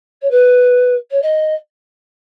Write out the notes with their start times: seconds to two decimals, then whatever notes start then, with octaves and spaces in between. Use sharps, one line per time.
0.21 C#5
0.30 B4
1.11 C#5
1.22 D#5